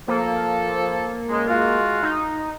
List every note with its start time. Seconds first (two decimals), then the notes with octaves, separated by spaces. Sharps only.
0.08 F3 A#3 A4
1.29 C#2 G#3
1.47 G#3 F4 F#4
2.03 D#4